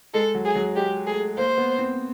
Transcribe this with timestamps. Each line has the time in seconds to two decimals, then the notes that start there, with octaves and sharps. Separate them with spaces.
0.14 G#3 A4
0.35 F#3
0.45 G#4
0.55 F#3
0.76 G#3 G4
1.07 A3 G#4
1.38 A#3 C5
1.58 B3
1.78 C4